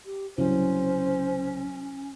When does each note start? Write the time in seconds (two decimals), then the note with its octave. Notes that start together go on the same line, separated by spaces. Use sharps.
0.06 G4
0.38 C2 C#3 F#3 C#4 C5